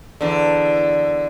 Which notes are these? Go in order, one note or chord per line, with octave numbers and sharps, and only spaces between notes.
E2 D3